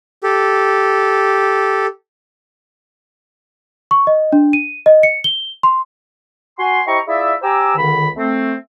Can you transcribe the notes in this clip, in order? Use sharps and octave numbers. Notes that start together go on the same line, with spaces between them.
G4 A4
C#6
D#5
D4
D#7
D#5
C#7
G7
C6
F#4 G#5 C6
E4 G4 C5 D#5 A#5 C#6
E4 F4 G#4 D5 E5
G4 C5 G#5 A#5 D6 E6
C#2 D3 D#3 B5
A3 C4